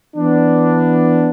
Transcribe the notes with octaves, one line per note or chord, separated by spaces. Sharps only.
E3 B3 D4